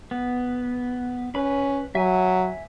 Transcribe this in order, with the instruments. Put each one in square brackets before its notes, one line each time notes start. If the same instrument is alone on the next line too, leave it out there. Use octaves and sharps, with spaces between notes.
[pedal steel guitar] B3
[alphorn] C#4 [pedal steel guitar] B4 B5
[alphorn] F#3 [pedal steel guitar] E5 G#5